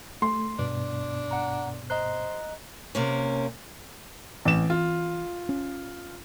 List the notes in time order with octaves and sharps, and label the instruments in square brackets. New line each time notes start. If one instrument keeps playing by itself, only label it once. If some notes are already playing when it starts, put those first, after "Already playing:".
[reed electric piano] A3 [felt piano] C6
[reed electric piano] G2 B2 B3 [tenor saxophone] D4
[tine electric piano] F#5 A#5
[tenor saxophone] C5 [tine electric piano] D#5 A#5 F#6
[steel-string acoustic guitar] C3 A#3 C#4
[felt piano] A1 E7 [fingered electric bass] E3 C4
[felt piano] F4
[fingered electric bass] C#4